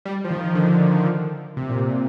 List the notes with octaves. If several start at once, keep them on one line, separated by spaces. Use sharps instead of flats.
G3
F3
D#3
D3
C3
A#2
C3